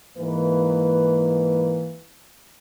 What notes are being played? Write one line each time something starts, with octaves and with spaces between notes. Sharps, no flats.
G#2 E3 A#3 B4